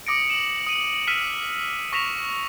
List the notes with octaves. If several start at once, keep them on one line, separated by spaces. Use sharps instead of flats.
D6 D#6 A#6 C#7 D7
E7 F#7
D#6 D#7
E6 F6 B6 D#7 E7
C#6 A#6 B6 E7 F7